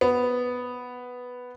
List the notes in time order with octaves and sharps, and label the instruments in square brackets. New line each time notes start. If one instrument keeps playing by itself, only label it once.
[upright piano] B3